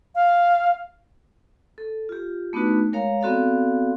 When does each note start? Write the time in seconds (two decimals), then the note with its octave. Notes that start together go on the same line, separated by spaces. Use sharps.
0.15 F5
1.78 A4
2.09 F4 G4
2.53 A3 B3 D4 D#4 F#4 B4
2.93 G#3 A#4 C#5 F5 A#5
3.21 B3 C4 F#4 A4 D5 F5